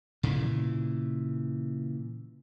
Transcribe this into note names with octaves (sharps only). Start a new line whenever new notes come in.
A#2 C#3 E3